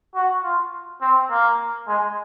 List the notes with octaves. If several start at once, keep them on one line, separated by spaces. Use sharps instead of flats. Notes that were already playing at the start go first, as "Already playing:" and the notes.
F#4
F4
C4
A#3
G#3